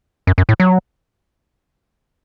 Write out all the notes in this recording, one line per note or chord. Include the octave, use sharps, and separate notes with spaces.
F#2
F#2
A2
F#3